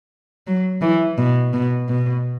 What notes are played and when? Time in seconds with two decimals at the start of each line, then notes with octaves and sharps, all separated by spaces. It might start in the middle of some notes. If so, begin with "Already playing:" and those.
0.47 F#3
0.82 E3
1.18 B2
1.53 B2
1.89 B2